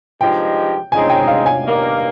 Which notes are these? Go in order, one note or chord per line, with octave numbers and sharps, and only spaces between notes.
G2 F3 G#3 D#4 G4 G5
C#3 G#3 C4 D#4 G#4 G#5
G5
F5
G#5
G2 D#3 A#3